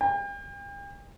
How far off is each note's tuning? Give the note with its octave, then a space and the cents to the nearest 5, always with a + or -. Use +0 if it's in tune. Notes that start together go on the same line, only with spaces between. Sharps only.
G5 +40